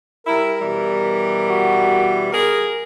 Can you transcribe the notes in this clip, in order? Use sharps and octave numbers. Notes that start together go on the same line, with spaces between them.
G3 E4 A#4
B2 E3 G3
F#4
G#4 A#4